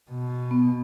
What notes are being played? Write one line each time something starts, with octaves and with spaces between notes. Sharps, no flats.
B2
B3